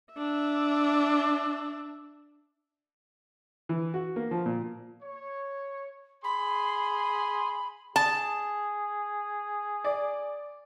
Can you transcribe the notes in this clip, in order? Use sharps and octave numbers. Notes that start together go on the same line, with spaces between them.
D4 E5
E3
F#4
A#3
F3
A#2
C#5
G#4 B5 C6
G#4 A5
D5